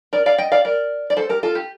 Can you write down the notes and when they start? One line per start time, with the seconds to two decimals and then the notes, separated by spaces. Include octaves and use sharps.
0.13 A#4 D5
0.26 D5 F5
0.38 D#5 G5
0.52 D5 F5
0.65 A#4 D5
1.10 D5
1.17 A4 C5
1.29 G4 A#4
1.43 F4 A4
1.55 G4